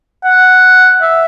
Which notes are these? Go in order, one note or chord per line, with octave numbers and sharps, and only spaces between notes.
F#5
E5